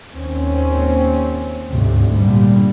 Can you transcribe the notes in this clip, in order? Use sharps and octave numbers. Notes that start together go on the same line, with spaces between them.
D#2 C4 C#4
G1 D2 G#2 C3 A3
A#2 D3 G3